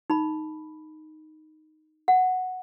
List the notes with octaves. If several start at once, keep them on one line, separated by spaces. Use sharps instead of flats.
D#4 B5
F#5